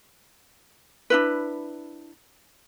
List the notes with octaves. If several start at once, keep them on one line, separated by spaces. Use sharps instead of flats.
D4 E4 B4